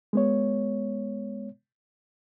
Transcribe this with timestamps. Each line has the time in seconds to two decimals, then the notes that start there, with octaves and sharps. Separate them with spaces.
0.13 G#3 B3 C#5